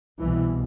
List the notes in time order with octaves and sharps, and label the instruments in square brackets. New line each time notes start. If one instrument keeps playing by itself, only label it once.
[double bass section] C2 B2 E3